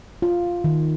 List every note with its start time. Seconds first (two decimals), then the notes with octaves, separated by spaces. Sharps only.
0.22 F4
0.64 D#3